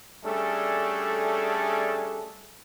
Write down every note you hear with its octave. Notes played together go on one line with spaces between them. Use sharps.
G3 A3 C#4 D4 G#4 A4